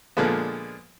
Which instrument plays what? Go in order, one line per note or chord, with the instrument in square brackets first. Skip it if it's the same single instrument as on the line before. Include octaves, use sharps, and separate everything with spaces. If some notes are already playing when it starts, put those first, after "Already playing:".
[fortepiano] A#2 D3 F3 G#3 B3